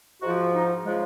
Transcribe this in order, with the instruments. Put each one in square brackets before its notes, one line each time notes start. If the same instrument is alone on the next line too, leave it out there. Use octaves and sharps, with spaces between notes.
[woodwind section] G#2 F3 F#4
D#4
C#3 F3 G#3